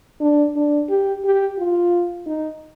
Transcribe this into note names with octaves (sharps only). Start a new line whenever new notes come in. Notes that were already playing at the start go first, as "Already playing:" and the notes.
D4
D4
G4
G4
F4
D#4